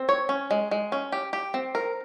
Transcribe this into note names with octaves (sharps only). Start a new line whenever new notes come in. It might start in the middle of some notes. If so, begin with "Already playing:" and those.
Already playing: C4
C#5
C#4
G#3
G#3
C#4
G4
G4
C4
A#4